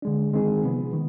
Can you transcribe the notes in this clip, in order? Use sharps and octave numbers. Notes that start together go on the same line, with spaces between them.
D3 G#3 D4
D#3 G#3 C4 D#4 G#4
C3 F3 B3
D#3